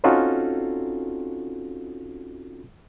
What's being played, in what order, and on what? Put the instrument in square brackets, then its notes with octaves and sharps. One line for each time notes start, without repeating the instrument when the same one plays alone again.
[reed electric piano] C4 C#4 D#4 F4 F#4 A4